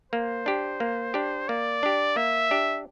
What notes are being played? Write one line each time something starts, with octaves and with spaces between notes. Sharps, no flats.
A#3 C5
D4 G4
A#3
D4 G4
A#3 D5
D4 G4
A#3 E5
D4 G4